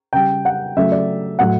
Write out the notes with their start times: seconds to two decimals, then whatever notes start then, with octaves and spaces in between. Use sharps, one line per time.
0.13 C#3 G3 G5
0.45 F#5
0.76 C#3 F#3 A3 E5
0.92 D5
1.39 A2 F#3 A3 F#5